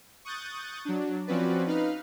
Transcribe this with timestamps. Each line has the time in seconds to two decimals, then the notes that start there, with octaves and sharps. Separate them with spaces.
0.25 C#6 D#6 F#6 G6 A6
0.85 F#3 D4
1.27 F3 C4 C#4 F#4 B4 D5
1.67 D#4 B4 F5 F6